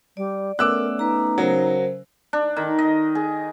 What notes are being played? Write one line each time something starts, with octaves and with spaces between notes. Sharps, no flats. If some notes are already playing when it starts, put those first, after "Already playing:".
G3 D5
A3 B3 C#4 A#4 D6 E6 F#6
D#4 B4 A#5
C#3 F#3 A#4 C5
D4
D#3
D#5
G#4